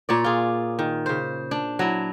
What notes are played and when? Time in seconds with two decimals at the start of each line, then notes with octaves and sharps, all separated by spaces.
0.09 A#2 C#5 D5
0.24 F4 G#4
0.79 D#3
1.06 C#3 C5
1.51 D4
1.79 F#3 E4